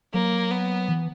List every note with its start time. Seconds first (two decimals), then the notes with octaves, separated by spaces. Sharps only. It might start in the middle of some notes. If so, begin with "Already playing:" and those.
0.13 F#3 A#3
0.51 B3
0.88 E3